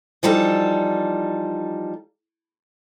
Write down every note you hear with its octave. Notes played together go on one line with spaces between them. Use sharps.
E3 F3 G3 D#4 A4